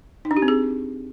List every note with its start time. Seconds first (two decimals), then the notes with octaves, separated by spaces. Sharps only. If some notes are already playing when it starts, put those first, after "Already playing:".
0.25 D#4
0.31 D4
0.37 G4
0.42 C4
0.48 G#4